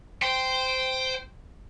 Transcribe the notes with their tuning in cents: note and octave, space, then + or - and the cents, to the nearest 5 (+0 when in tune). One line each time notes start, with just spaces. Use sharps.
C5 -10 G5 +0